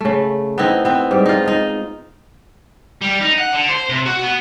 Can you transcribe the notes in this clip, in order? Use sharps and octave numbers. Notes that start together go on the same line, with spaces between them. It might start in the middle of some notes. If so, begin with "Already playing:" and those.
C#3 A3
B3 C4 D#4 E4
B3 C4
G#2 G3
D#4 F4
D#4 F4
G3
D#4
F#5
D3
C5
C3
F#4
B3